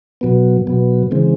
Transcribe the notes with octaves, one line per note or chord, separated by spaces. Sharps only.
B2 F#3 B3
B2 F#3 B3
C#3 E3 G#3 C4